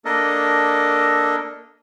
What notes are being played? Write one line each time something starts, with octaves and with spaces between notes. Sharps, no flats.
A#3 D4 A4 A#4 D#5